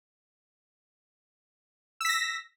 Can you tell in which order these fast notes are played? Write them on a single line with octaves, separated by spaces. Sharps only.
E6 B6 A#6